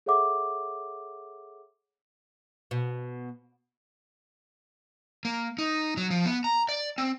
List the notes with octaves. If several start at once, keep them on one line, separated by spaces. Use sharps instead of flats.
G#4 A4 C#5 E5 F#5 D6
B2
A#3
D#4
F#3
F3
B3
A#5
D5
C4